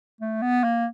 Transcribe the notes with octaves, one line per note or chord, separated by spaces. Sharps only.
A3
B3
A#3